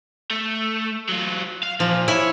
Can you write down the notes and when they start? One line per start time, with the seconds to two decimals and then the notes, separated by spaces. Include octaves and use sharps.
0.30 A3
1.09 F#3 F4
1.63 F5
1.80 A#2 F3
2.08 E4 C#5 G#5